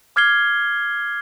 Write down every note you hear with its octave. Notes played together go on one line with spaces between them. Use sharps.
D6 F6 G#6 C7 G7